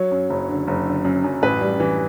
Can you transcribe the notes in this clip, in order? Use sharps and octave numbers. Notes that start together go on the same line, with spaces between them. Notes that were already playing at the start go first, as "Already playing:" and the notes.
Already playing: F#3 C#5
F#2
F#1
D3
F#1
D3
F#2
F#2
A1 B4
G3
E3